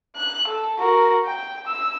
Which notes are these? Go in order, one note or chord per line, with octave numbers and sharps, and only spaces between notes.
F#6
A4
F#4 A#4
G5
E6